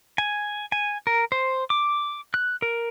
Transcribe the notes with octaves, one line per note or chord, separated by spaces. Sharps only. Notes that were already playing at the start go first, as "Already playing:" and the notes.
G#5
G#5
A#4
C5
D6
F#6
A#4